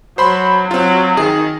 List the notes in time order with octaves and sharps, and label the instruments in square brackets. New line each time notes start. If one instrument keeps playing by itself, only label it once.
[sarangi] F#3 [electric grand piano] C5 B5 C6
[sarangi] F#3 [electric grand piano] C4 F4
[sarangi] D#3 [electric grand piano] G#4